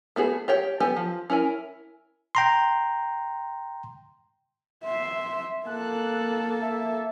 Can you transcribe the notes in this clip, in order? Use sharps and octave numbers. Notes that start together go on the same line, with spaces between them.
A3 B3 F#4 G#4
G4 C#5 G5
B3 G4 A4 G5 G#5
F3
C#4 E4 A#4 G#5
G5 A#5 C6
E5 C6
A#3 A4 F#6
E5